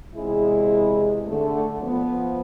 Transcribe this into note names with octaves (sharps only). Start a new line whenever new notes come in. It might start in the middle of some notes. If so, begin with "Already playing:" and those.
E2 C3 G#3 E4 G#4
D3 A3
F3 B3